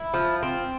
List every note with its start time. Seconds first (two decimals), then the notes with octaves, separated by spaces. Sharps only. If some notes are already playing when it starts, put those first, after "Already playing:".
Already playing: E4
0.14 F3
0.43 C4